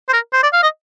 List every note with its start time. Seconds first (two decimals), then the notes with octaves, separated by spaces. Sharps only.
0.09 C5
0.13 A#4
0.33 C5
0.43 D5
0.53 F5
0.63 D#5